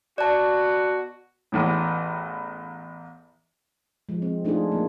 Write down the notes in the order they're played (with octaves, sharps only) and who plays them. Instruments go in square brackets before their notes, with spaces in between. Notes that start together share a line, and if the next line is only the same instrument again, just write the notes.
[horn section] B2 F#4 [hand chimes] D5 A5
[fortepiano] A1 E2 A2
[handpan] F3 G#3
C4
A3 D4 D#4 F4 G#4
F#3 A#3